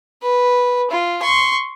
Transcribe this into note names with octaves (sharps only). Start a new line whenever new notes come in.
B4
F4
C6 C#6